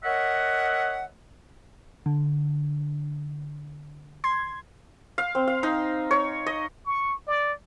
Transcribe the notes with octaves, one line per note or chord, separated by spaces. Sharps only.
A#4 C#5 D#5 E5 F#5
D3
C6 G#6
F5
C4
F5
D#4
C#5
D#5
C#6
D5